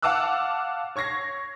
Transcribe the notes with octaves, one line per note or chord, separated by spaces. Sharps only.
F5 F#5 A5 D6 E6 F#6
C#5 C#6 G#6 A#6 C7